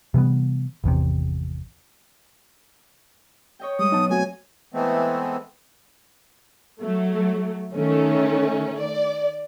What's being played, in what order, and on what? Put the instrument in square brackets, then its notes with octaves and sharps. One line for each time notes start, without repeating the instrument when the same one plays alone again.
[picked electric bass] C3 E3 G3 B3
G#1 E2 C3
[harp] C#5 D#5 G5
[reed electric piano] G3 G#3 [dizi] D#6
[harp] B2 F#3 [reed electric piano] D#4 A5
[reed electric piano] A3 C4 F#4 [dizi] G#5
[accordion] E3 G#3 A3 B3 C4
[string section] F#3 A3
D#3 A3 C#4
D5